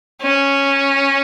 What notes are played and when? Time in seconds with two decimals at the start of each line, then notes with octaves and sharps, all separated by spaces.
0.22 C#4